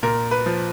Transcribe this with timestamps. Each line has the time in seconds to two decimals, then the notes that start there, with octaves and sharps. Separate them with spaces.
0.03 A#2 A#4
0.31 B4
0.46 F3